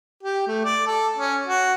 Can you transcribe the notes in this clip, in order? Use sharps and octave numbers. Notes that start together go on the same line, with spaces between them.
G4
A3
D5
A4
C#4
F#4